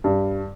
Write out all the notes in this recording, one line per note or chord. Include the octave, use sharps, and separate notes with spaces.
G2